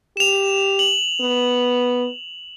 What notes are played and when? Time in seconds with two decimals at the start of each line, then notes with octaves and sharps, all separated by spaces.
0.17 G4 E7 F7
0.79 F#7
1.21 B3